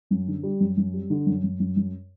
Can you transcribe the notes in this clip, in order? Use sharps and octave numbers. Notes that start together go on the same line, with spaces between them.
F#2
D3
G3
F#2
F#2
G3
D3
F#2
F#2
F#2
F#2